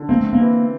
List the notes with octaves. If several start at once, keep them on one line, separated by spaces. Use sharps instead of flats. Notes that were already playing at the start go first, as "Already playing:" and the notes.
Already playing: D3
A#3 C4
A3
A#3
E3